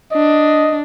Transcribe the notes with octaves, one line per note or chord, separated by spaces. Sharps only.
D4 D#5